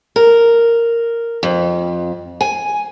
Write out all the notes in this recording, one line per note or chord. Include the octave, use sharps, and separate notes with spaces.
A#4
F2
G#5